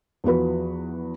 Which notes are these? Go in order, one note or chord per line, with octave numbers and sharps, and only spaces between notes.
E2 F3 F#4 B4